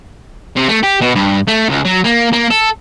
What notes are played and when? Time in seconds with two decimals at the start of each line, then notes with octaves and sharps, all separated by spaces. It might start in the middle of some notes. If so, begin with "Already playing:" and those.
0.56 C3
0.68 A3
0.83 G4
1.01 B2
1.15 G2
1.47 A3
1.69 C#2
1.85 F#3
2.04 A#3
2.33 A#3
2.51 A4